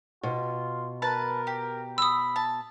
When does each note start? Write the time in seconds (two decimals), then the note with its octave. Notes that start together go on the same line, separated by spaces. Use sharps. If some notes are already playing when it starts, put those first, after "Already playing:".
0.23 B2 F4
1.02 A#4 B4 A5
1.47 G4
1.98 B5 D#6 E6
2.36 A5